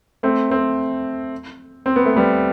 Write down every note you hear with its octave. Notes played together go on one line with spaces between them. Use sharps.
A3 C4
A3 C4
C4
B3
A3
G3 B3